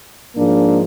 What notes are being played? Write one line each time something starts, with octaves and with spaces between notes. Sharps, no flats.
G#2 F3 G#3 A#3 D4